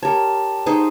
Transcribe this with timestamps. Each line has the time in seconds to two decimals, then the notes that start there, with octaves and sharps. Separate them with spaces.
0.03 G4 A#4 C#5 A5
0.66 D#4 G#4 C5